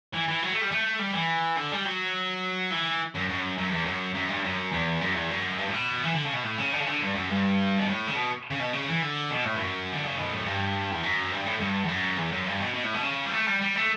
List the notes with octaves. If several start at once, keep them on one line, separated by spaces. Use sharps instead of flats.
E3
E3
F#3
A3
G3
A3
G3
E3
D3
G3
F#3
E3
F#2
F#2
F#2
E2
F#2
F#2
G2
F#2
E2
F#2
E2
F#2
G2
A2
B2
E3
D3
C#3
B2
A2
C#3
D3
C#3
D3
G2
F#2
G2
B2
A2
C#3
B2
C#3
B2
C#3
E3
D3
B2
A2
G2
F#2
D3
C#3
B2
A2
G2
E2
F#2
G2
A2
G2
E2
F#2
E2
F#2
G2
B2
B2
A2
B2
C#3
G3
A3
G3
G3
A3